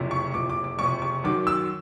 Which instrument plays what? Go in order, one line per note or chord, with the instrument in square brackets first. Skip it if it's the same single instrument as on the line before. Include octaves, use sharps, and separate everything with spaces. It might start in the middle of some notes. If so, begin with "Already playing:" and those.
Already playing: [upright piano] F#1 F2 C3
C#6
F#1 F2 C3 D6
D6
D6
F#1 F2 C3 C#6
C#6
F#2 D#3 F#3 D6
E6